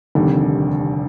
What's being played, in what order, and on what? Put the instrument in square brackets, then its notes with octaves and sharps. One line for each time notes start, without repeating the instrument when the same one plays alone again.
[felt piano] F1 D#2 D3 G3